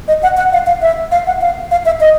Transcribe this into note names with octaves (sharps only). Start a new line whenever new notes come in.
D#5
F#5
F#5
F5
F5
E5
F5
F#5
F5
F5
E5
D#5